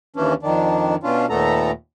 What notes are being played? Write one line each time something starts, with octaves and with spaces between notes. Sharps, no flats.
D#2 E3 C#4 D4
F2 D#3 D4
B2 C#4 D4 F4
D#2 A#2 A3 B3 A4 A#5